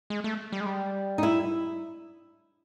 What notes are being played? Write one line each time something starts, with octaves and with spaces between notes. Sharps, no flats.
G#3
A3
G3
G#3
G3
D#4
E4